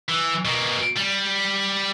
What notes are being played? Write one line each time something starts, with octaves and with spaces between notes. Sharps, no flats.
E3
B2 A#3
G3